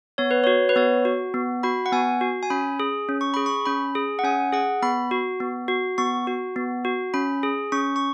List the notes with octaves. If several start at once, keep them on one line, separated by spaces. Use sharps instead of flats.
B3 C#5
B4
F#4 C#5
B4
B3 C#5
F#4
B3
F#4 B5
F#5
B3 G#5
F#4
G#5
C#4 B5
G#4
C#4
C#6
G#4 B5
C#6
C#4 B5
G#4
F#5
C#4 G#5
G#4 F#5
B3 B5
F#4
B3
F#4
B3 C#6
F#4
B3
F#4
C#4 B5
G#4
C#4 C#6
C#6